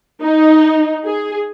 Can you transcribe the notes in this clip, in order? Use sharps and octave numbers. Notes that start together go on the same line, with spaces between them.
D#4
G#4